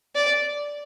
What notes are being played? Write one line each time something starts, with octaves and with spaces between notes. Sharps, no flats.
D5